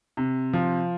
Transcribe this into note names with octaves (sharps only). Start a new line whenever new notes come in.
C3
F3